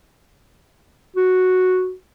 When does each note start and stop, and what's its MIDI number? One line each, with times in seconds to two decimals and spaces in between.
1.16 1.93 66